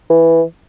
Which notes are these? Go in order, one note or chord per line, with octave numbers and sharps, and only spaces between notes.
E3